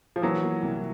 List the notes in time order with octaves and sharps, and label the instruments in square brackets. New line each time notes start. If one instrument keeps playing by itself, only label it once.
[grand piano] F3
[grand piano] E3 F#3 [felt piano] A#3
[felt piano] A#3
C2